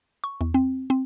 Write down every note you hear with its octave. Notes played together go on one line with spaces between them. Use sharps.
C#6
E2
C4
C4